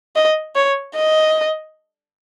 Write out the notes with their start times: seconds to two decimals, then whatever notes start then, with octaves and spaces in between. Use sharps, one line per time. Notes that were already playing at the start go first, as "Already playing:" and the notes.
0.16 D#5
0.55 C#5
0.96 D#5